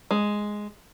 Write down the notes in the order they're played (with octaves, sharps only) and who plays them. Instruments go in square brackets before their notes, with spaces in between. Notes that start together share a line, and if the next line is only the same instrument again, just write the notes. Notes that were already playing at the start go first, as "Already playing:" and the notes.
[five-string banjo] G#3